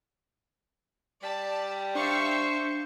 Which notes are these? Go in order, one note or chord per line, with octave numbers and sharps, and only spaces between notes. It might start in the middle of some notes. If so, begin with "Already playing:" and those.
G3 D5 A5 B6
D4 C5 E5 F5 C#6